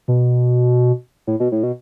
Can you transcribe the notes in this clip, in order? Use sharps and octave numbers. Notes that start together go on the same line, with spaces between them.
B2
A2
B2
A2
B2